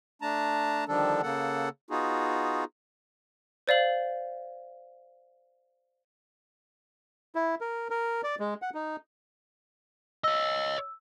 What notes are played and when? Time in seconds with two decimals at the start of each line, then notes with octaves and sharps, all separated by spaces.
0.22 A3 D4 A5 A#5
0.88 D3 D#3 F3 G3 D4 A4
1.23 C#3 A#3 A4 F#5
1.90 B3 D#4 F4 F#4 G#4
3.68 C5 D5 F5 F#7
7.35 E4
7.61 A#4
7.90 A#4
8.24 D5
8.40 G#3
8.62 F#5
8.74 D#4
10.24 C#5 D#5 E6